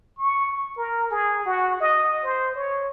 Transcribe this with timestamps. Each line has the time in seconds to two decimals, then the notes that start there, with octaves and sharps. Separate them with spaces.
0.18 C#6
0.77 A#4
1.11 G#4
1.46 F#4
1.80 D#5
2.24 C5
2.55 C#5